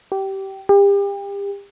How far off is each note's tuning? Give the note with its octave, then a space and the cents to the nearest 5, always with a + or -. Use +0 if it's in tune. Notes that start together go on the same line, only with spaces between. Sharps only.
G4 -20
G4 +35